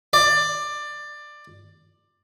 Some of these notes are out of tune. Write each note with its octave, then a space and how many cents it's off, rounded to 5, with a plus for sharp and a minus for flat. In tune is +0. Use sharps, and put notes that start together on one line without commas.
D5 +15